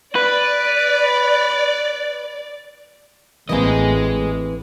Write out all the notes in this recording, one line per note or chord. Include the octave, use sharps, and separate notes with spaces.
B4 D5
A1 E3 A#3 C4 G#4 D#5